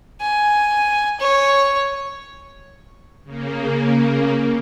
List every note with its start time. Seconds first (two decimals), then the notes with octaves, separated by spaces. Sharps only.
0.21 G#5
1.20 C#5
3.24 C#3 A#3